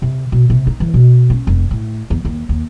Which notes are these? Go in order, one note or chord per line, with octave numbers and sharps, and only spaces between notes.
C3
B2
C3
D#4
E3
B2
C#4
F1
A2
E2
D#2
D#2